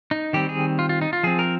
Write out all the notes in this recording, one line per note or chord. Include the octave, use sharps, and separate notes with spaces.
D#4
D#3 G3 C4 G4
G#4
F4
F4
D#4
F4
F3 C4 G#4
A#4